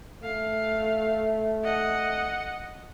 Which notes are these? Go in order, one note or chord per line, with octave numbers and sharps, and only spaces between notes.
A3 F5
D#5 F#5